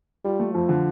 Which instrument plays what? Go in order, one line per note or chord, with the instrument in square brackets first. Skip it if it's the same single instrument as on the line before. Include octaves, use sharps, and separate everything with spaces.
[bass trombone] G3 [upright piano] F4
[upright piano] A3
[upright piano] F2 [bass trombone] F3
[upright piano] D3